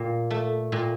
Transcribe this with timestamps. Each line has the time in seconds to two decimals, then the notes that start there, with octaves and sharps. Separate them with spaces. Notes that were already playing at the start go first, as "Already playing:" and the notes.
Already playing: A#2
0.31 A3
0.72 A#2